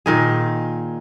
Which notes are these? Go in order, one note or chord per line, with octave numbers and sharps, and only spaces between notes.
A#2 D#3 G#4